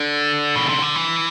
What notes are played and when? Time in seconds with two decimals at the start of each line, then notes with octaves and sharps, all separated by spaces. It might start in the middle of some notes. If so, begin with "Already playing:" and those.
Already playing: D3
0.56 B2
0.69 C3
0.82 D3
0.95 E3